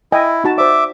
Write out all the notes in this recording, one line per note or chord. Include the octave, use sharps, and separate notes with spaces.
E4 D#5 G5 G#5
D#4 F#4 A5
C5 D5 E5 D6